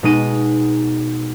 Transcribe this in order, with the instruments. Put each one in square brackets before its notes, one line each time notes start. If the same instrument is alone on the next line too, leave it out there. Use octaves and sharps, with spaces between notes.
[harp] B2 G#3 D#4 D#7